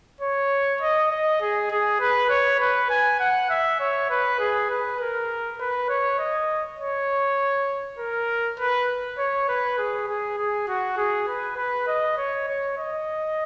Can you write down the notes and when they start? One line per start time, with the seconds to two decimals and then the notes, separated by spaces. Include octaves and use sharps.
0.21 C#5
0.81 D#5
1.11 D#5
1.41 G#4
1.71 G#4
2.00 B4
2.30 C#5
2.60 B4
2.90 G#5
3.19 F#5
3.50 E5
3.80 C#5
4.10 B4
4.39 G#4
4.70 B4
5.00 A#4
5.60 B4
5.89 C#5
6.18 D#5
6.79 C#5
7.99 A#4
8.59 B4
9.18 C#5
9.48 B4
9.78 G#4
10.08 G#4
10.38 G#4
10.68 F#4
10.97 G#4
11.28 B4
11.57 B4
11.87 D#5
12.18 C#5
12.48 C#5
12.78 D#5